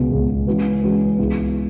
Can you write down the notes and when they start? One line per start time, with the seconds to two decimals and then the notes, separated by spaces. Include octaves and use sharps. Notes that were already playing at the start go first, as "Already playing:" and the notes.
Already playing: C#2 B2 G#3 B3
0.11 C#2 B2 G#3 B3
0.47 E3 G#3 C#4 F#4 B4
0.83 E3 G#3 C#4 F#4 B4
1.19 C#2 C#3 G#3 B3 E4